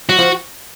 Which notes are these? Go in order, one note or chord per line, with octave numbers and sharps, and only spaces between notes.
F#3 F#4
F3